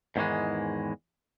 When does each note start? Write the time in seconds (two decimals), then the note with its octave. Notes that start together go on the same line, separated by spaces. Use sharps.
0.16 E2 G#2 D#3 E3 G#3